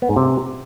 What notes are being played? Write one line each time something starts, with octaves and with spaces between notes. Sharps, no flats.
B3
G#2
C3